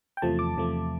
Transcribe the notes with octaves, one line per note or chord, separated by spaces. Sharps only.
G5
E2 C3 F3 A3 A5
D6
E2 C3 F3 A3